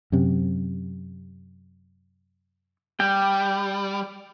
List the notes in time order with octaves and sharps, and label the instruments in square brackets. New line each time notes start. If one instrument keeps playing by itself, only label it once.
[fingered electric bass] F#2 C3
[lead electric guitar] G3 [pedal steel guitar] G5